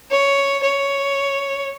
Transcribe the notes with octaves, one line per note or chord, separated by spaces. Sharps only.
C#5
C#5